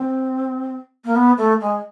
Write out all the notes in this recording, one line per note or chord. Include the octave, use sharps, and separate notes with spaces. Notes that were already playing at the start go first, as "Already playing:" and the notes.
Already playing: C4
A#3
B3
A3
G#3